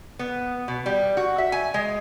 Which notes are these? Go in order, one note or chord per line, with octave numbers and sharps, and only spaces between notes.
B3
B2
G3
F#4
E5
G#5
G#3